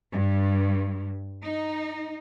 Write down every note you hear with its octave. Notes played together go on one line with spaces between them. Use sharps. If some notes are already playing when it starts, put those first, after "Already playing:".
G2
D#4